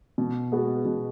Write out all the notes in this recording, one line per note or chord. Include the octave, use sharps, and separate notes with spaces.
B2
G#3 B3 F#4
B2